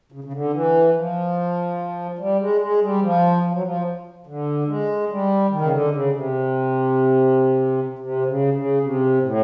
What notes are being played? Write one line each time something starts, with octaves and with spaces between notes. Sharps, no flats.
C#3
C#3
D3
E3
F3
G3
G#3
G#3
G3
F3
F3
F#3
F3
D3
G#3
G3
D#3
C#3
D3
C#3
C3
C3
C#3
C#3
C3
A2